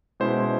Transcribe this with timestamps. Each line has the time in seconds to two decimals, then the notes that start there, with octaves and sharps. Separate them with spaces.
0.20 B2 G#3 C#4 E4 C5